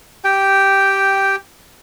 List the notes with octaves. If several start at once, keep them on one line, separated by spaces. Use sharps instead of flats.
G4 G5